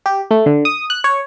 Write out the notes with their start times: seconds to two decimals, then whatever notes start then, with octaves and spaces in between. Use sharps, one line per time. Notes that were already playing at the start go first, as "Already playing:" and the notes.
0.06 G4
0.31 A3
0.46 D3
0.65 D#6
0.90 F#6
1.04 C#5